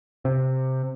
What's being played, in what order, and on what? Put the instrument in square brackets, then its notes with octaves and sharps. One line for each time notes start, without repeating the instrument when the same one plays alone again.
[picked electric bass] C3